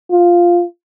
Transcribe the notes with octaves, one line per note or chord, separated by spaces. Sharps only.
F4